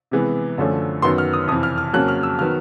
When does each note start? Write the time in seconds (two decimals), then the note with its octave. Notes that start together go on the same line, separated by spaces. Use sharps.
0.11 C3 E3 G#3 B3
0.58 F#2 D3 F3 A3 C#4
1.02 F#2 D#3 F#3 B3 C6
1.18 F6
1.33 D#6
1.47 F2 C3 E3 D#6
1.63 F6
1.78 F6
1.93 F2 C#3 F#3 A#3 C#4 F#6
2.08 F6
2.23 E6
2.39 D#3 F#3 B3 F6